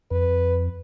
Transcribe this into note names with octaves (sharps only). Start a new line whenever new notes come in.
F2 B4